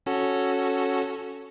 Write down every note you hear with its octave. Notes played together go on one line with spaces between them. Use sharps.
C#4 F#4 A4